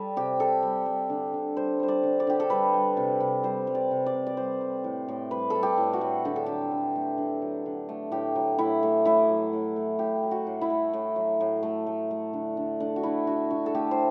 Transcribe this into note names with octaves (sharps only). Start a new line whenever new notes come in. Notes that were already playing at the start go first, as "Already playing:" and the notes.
Already playing: G3 A4
C3 G4
C3 A4
G3
G3
D3
D3
G3 C5
G3 C5
D5
D3
D5
D3 G4
A4
G3 B4
G3
C3
C3
G3 C5
G3
D5
C3
D5
C3
D5
G3 C5
G3
A2
A2
G3 B4
A4
G3
G4
A2
F#4
A2
D3 G4
A4
F#3 G4
D3
A3
D3
F#3
D3
A3
A2 G4
F#3
A2 E4
A3
A2 E4
F#3
A2
A3
A2 G4
F#3
F#4
A2
E4
A3
A2
F#3
A2
A3
A3
A3
D3
D3
A3 D4
F#4
A3 E4
D3 F#4
D3 F#4
A4
A3 G4
C5